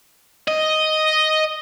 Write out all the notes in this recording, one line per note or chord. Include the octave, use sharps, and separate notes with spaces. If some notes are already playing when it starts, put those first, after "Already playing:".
D#5